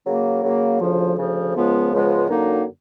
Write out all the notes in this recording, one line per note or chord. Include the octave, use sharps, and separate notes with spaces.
C#3 F#3 A#3
C#3 F#3 A#3
D2 C#3 F3
D2 C#3 F3
C#2 C#3 F3 G#3 B3
C#2 C#3 F3 G#3 B3
F#2 D3 F#3 A#3 D#4